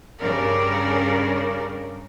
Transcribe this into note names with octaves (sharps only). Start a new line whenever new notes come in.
G2 C#3 A#4 D5